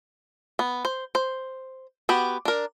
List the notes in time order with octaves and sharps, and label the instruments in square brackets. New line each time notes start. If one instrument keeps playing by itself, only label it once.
[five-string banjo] B3
C5
C5
B3 F#4 G4
D4 A#4